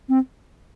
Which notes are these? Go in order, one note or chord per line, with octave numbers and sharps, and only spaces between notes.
C4